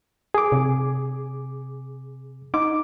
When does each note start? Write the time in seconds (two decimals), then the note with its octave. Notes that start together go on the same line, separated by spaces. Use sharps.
0.34 G#4 D6
0.52 C3
2.54 D#4 D6